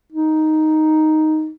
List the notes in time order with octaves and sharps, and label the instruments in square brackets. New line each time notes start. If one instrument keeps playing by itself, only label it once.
[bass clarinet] D#4